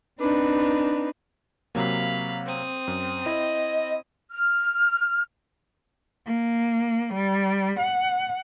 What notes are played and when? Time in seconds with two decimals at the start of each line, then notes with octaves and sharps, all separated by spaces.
0.20 C4 D4 D#4 B4
1.75 C3 F#3 A#3 F5 B5
2.46 C4 D#6
2.88 F#2
3.26 E4 D#5
4.32 F6
6.27 A#3
7.14 G3
7.80 F#5